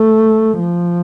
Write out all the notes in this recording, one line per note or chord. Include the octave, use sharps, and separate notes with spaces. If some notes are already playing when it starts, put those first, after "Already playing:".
Already playing: A3
F3